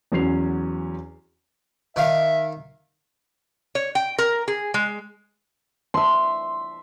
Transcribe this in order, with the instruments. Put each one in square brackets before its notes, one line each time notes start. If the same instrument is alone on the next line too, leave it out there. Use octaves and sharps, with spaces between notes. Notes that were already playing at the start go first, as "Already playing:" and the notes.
[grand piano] E2 F#3 C#4 F#4 C7 F7
[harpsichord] D#3 F5 [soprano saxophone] E5
[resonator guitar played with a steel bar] C#5
G5
A#4
G#4
G#3
[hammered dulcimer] E5 C6